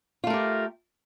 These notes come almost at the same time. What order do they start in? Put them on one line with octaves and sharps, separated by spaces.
F4 A3 A#4 G4